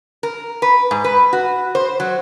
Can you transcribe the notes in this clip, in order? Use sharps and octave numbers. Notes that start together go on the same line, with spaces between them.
A#4
B4
G#2
B4
F#4
C5
F#3